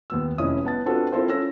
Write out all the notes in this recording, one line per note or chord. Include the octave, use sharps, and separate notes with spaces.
D#2 B3 E6
F1 C#4 E4 D#5 D#6
B3 A5 A6
C4 D4 F4 F#4 A4 B4
C4 E4 F4 A4 A#4 C5
C#4 F4 A4 E6 A#6